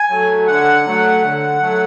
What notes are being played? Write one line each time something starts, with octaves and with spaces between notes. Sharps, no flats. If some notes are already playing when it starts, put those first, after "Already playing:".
Already playing: G#5
F#3 A3
D3 F#5
F#3 A3
D3
F#3 A3